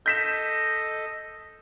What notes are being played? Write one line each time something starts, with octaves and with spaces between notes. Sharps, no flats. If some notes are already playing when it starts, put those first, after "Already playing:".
A4 D#5 G6 B6 E7